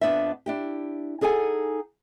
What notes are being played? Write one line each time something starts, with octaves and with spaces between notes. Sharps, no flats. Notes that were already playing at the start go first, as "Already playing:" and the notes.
F2 F#3 B3 D4 C5 E5
D4 E4 G4
D#4 G#4 A4 F#5 G#5